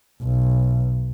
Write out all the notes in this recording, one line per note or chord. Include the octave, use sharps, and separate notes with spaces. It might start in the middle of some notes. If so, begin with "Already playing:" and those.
B1